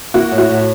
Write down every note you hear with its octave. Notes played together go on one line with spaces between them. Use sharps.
A#3 E4 F#4
A2
E4 F#4
A2